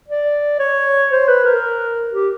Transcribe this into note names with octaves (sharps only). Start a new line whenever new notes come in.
D5
C#5
C5
B4
A#4
G4